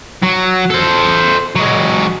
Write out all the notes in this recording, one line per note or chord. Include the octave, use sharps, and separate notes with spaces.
F#3
A4 C5
F#3 G#3